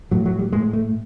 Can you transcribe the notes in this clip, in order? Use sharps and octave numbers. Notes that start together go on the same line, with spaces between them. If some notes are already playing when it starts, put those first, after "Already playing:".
A2 F#3
F#3
G3
A2 G#3
A3